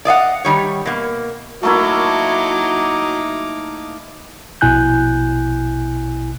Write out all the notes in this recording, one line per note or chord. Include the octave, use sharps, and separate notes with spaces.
D5 D#5 F5 F#5
D#3 G3 C#5
B2 A#3
F#3 A3 A#3 D#4 E4 D6
A#1 B2 E4 G#5 F#6 G6